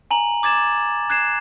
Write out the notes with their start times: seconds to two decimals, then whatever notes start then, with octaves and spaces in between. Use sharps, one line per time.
0.11 G#5 A#5 F#7
0.43 D6 G#6 A6 E7
1.10 F#6 G#6 C7 E7